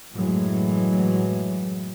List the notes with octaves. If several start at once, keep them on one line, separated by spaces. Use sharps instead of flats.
F#2 A2 E3 F#3 G#3